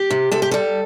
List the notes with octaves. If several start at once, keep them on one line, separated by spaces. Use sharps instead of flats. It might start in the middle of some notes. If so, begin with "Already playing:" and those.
Already playing: G4
C3
C3 A4
G4
G3 A4